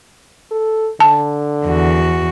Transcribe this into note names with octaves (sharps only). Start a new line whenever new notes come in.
A4
D3 A5
E2 F#4